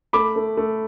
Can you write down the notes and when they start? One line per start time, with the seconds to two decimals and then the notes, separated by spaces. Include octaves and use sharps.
0.13 A3 B5 D6
0.36 A3
0.57 A3